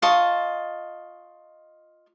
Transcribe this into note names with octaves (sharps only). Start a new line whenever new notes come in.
F4 D#5 A5 C#6